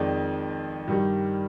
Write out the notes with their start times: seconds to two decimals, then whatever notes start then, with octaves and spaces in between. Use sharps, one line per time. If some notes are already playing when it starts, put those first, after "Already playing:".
Already playing: F2 D#3 G#3 D5
0.88 G2 D#3 G3